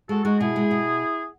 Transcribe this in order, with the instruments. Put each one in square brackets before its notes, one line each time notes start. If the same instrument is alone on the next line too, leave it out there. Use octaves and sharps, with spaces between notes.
[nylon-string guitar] G#3 [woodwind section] F#4 A4
[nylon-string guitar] G#3 [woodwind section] D#4 F#4
[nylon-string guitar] B2 [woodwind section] E4 G#4
[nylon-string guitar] G#3
B2